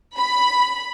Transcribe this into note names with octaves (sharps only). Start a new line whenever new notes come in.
B5